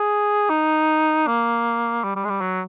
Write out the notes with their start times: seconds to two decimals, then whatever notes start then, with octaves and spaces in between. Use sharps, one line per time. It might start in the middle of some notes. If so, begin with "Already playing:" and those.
Already playing: G#4
0.50 D#4
1.27 A#3
2.04 G3
2.16 G3
2.25 G#3
2.29 G3
2.41 F#3